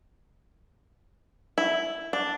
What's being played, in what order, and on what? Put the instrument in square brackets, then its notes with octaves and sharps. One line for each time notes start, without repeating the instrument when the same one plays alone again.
[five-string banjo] E4
D4